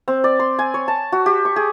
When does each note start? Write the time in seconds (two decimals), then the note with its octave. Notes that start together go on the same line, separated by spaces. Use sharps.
0.08 C4
0.24 D5
0.39 C6
0.59 G#5
0.74 C#5
0.88 A5
1.12 F#4
1.26 G4
1.45 C#6
1.56 G#4